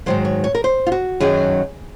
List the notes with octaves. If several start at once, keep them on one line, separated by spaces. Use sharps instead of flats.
G#2 D#3 F#3 C5
C#5
C#5
A#4
C5
F4
F#4
F#2 D#3 F#3 G#4